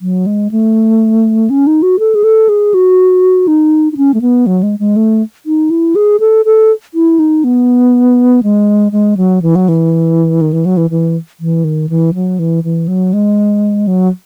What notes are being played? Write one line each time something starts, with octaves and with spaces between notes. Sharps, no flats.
F#3
G#3
A3
C#4
D#4
F#4
A4
G#4
A4
G#4
F#4
D#4
D#4
C#4
A3
B3
F#3
G#3
G#3
A3
D#4
E4
G#4
A4
A4
E4
D#4
B3
G#3
G#3
F#3
E3
F#3
E3
D#3
E3
F#3
E3
E3
E3
D#3
E3
F#3
E3
E3
F#3
G#3
F#3